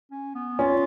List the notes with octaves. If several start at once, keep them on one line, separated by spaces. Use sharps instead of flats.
C#4
B3
C#4 F4